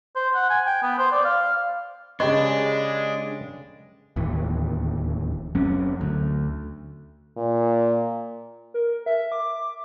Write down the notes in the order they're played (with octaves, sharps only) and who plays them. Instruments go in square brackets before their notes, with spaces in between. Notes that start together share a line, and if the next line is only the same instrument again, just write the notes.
[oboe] C5
F#5
G#5
G5
B3
C5
D5
F5
[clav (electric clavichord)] C#3 G4 B4 [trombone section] G#3 [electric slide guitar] D4 [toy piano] D#5 C#6
[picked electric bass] D1 D#2 E3
F#1 F#3 C4 C#4
D2
[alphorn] A#2
[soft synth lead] A#4
E5
D6